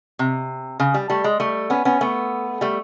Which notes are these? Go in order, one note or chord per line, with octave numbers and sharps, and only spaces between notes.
C3
C#3
G3
G3 A3
G#3
G3 A3
B3 C#4
B3 C#4
A3 B3
G3 A3